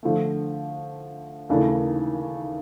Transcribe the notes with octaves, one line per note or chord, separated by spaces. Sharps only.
D3 F3 A3
D#2 C#3 E3 A3 D4